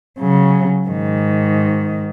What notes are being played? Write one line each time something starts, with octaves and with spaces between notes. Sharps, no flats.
C#3 F#3
G#2 D#3